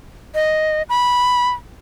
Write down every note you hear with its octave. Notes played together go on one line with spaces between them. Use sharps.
D#5
B5